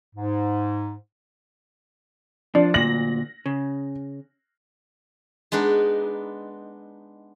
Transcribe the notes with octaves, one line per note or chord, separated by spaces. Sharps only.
G#2
F3 D4
D2 A#2 A#6 F#7
C#3
G#3 B3 D4 D#4